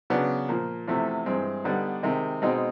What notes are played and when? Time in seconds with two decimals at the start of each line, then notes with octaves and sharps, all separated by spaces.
0.10 C#3 F#3 B3 D4
0.49 A#2 F3 A#3
0.87 E2 C3 F3 A3
1.26 G2 E3 G#3 C4
1.64 D3 G3 B3 D#4
2.03 C3 D#3 G#3
2.42 B2 G#3 C4 D#4